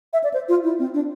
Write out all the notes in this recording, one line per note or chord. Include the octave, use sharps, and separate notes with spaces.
E5
D5
C5
F4
E4
C4
D4